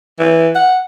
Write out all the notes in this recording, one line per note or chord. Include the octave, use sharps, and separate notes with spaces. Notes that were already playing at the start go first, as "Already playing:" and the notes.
E3
F#5